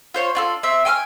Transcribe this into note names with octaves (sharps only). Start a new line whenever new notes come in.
F4 C5 C#5
D4 F4 A4
C4 E5
G5 G#5 C6 F6